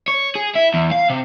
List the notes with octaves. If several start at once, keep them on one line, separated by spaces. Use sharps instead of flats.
C#5
G#4
E4
E2
F5
C3